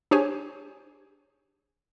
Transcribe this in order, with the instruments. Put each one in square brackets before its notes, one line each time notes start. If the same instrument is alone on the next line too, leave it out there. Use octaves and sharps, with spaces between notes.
[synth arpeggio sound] D4 G4 G#4 C5 C#5 G#5